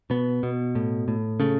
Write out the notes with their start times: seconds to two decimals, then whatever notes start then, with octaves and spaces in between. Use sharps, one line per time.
0.10 B2 B3
0.43 B2
0.75 A2
1.08 A2
1.40 C#3 A3